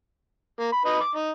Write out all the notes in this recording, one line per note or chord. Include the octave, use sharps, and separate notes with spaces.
A#3
B5
D#4 B4 D#5
D6
D#4